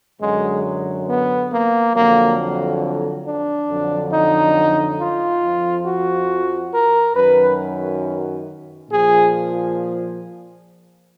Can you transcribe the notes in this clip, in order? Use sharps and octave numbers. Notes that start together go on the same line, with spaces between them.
F#2 D3 F#3 G#3
B3
A#3
F2 D3 F#3 A#3
D4
F2 D3 F#3
D#4
F4
F2 F3
F#4
A#4
F#2 D#3 F#3 B4
A#2 F3 G#4